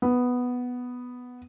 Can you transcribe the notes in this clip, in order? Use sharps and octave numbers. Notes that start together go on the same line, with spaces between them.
B3